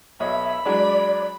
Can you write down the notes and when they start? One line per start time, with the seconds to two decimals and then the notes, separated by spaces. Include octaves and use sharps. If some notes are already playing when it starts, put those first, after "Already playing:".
0.20 B1 C#5 D#5 E5 B5
0.65 F#3 G#3 D4 D5